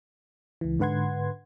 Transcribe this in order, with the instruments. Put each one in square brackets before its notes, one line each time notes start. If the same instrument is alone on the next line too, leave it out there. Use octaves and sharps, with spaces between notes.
[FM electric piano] C#2 E3
G#2 D3 B4 F#5 C6 G#6